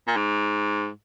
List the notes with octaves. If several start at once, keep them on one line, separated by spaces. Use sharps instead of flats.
A#2
G#2